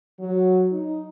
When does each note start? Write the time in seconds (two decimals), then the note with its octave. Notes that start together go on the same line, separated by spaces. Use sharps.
0.20 F#3
0.73 D#4